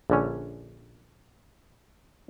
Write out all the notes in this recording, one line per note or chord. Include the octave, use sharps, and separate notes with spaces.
A#1 D3 C#4